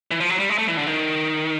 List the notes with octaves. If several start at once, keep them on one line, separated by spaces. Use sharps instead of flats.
E3
F3
F#3
G3
G#3
A3
E3
D3
D#3